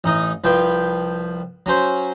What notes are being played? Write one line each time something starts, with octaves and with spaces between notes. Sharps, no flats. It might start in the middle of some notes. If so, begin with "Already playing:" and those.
A1 D#4 D#5
C2 F3 B4 G5
F#3 C#4 C5